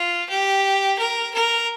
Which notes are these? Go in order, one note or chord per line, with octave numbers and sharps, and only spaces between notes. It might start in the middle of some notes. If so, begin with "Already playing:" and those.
Already playing: F4
G4
A#4
A#4